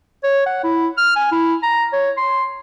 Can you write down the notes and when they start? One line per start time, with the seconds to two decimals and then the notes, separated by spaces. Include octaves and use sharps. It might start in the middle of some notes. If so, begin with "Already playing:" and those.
0.23 C#5
0.46 F#5
0.64 E4
0.98 F6
1.16 G#5
1.32 E4
1.63 A#5
1.93 C#5
2.17 C6